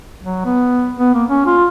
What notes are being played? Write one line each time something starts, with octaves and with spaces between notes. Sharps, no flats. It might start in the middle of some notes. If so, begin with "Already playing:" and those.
F#3
B3
B3
A#3
C#4
F4